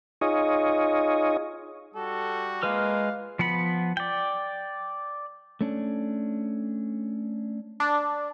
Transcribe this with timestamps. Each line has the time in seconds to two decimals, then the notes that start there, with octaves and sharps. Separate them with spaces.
0.21 D#4 F4 G#4 C#5 D#5
1.95 G3 F#4 A4
2.63 G#3 A#3 F4 B4 F5 F6
3.39 F3 B3 F#5 B5
3.97 D5 G5
5.61 A3 C#4 D4
7.80 D4